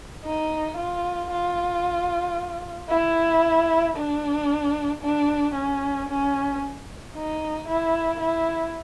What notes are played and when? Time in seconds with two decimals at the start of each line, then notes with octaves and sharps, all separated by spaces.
0.25 D#4
0.77 F4
1.30 F4
2.90 E4
3.96 D4
5.02 D4
5.55 C#4
6.09 C#4
7.14 D#4
7.68 E4
8.20 E4